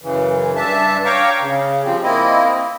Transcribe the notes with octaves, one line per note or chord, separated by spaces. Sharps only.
F#2 C#3 E3
G2 D4 E5 A5
C#5 F5 G5 A#5 C#6 D6
C#3
F3 G3 C4
A#3 C4 E4 D#5